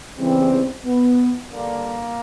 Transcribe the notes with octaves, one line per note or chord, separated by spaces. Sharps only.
E2 C#3 E3 G3 C4
B3
G2 D3 G3 A#3